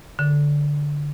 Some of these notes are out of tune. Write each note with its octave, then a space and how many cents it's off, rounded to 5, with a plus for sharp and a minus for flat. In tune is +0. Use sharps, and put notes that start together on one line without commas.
D3 -5